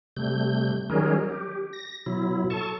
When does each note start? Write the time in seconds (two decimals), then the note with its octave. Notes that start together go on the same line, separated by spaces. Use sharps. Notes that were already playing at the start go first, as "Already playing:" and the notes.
0.17 C3 G3 A3 G6
0.90 D#3 F#3 G3 C#4 G#4 A#4
1.30 G4
1.73 A#6
2.06 B2 F#3 E4
2.50 A4 A5 C#6